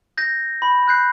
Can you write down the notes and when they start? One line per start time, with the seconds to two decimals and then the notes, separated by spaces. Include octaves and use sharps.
0.17 G6 A#6
0.62 B5
0.88 F#6 G6 C7